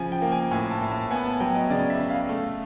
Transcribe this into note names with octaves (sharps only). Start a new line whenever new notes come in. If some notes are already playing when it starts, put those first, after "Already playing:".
Already playing: C#3 F3 G#5
G5
A#3
G#5
A2 G#5
A5
A2
A5
B3 G#5
A5
F#3 G5
D#5
C#3 D5
E5
C#3
F5
A3